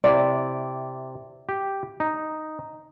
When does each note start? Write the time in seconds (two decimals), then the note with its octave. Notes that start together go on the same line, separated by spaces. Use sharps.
0.04 C3 E4 D5
1.49 G4
2.00 D#4